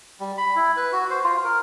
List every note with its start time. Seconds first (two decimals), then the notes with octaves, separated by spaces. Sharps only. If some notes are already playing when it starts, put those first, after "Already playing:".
0.20 G3
0.38 B5
0.56 E4
0.76 B4
0.93 F#4
1.10 C5
1.24 F4
1.44 A#4